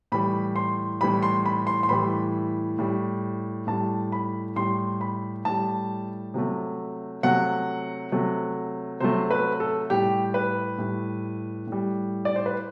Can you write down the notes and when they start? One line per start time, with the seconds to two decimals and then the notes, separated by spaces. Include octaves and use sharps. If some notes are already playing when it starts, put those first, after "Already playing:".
0.12 A2 E3 G3 B5
0.56 C6
1.01 A2 E3 G3 B5
1.23 C6
1.46 B5
1.67 C6
1.83 C6
1.89 A2 E3 G3 B5
2.78 A2 G3
3.67 A2 G3 A5
4.12 B5
4.56 A2 G3 C6
5.01 B5
5.45 A2 G3 A5
6.34 C3 F#3 A3
7.23 C3 F#3 A3 F#5
8.12 C3 F#3 A3
9.00 C3 F#3 A3 C5
9.31 B4
9.60 A4
9.90 A2 G3 G4
10.34 B4
10.78 A2 G3
11.67 A2 G3
12.25 D5
12.36 C5
12.46 B4